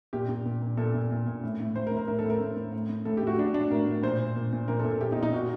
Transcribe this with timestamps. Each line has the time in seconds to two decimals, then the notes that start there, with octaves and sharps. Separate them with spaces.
0.13 A#2 G4
0.29 A#2
0.46 A#2
0.62 A#2
0.77 A#2 A4
0.94 A#2
1.11 A#2
1.27 A#2
1.44 A2
1.60 A2
1.76 A2 C5
1.87 A#4
1.91 A2
1.97 A#4
2.08 A2 A#4
2.19 A4
2.25 A2 A#4
2.41 A2
2.56 A2
2.73 A2
2.89 A2
3.05 A2 A4
3.17 G4
3.22 A2 F#4
3.38 A2 D4
3.54 A2 D4
3.70 A2 A#4
3.87 A2
4.03 A#2 C5
4.20 A#2
4.36 A#2
4.53 A#2
4.68 A#2 A#4
4.79 A4
4.85 A#2
4.91 A4
5.01 A#2 G4
5.12 D#4
5.17 A#2
5.23 D#4
5.33 A#2 F#4